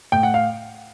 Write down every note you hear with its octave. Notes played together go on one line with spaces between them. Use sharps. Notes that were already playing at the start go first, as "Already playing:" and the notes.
A2 G5
F#5
F5